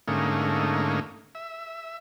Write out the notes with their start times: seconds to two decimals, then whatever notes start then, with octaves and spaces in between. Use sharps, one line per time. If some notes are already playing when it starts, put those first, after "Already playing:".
0.08 G#2 D3 A3 A#3 C#4 D#4
1.35 E5